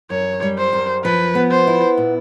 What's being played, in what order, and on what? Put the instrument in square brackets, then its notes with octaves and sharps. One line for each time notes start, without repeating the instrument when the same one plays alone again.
[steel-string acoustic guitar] F#2 [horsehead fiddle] C#5
[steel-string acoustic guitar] G3
[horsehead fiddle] C5
[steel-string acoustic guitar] F#2
[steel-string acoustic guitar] F3 [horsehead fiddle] B4
[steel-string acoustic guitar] B3
[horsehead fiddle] C5
[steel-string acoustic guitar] E4
A#2